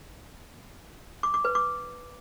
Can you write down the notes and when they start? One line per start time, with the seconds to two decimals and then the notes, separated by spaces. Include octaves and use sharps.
1.23 D6
1.34 D6
1.44 B4
1.55 D6